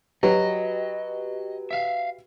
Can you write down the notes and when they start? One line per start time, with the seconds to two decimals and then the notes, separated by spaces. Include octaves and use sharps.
0.23 F#3 F#4 G4 B4 D#5
1.71 E5 F5